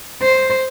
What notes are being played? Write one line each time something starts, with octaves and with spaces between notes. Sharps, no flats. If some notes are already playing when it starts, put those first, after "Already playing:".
C5